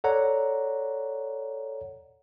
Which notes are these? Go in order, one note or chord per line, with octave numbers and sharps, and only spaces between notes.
A4 C#5 D5 F#5 A#5